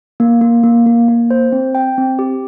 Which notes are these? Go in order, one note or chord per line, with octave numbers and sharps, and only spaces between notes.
A#3
A#3
A#3
A#3
A#3
C5
C4
G5
C4
G4